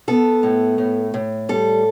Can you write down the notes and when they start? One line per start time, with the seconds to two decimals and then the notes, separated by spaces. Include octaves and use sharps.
0.08 B3 A4
0.43 A2
0.78 A2
1.14 A2
1.49 G3 A4